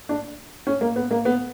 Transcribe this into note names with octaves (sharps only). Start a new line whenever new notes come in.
D4
C#4
A#3
B3
A#3
B3